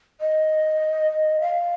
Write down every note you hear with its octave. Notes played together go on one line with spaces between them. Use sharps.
D#5
F5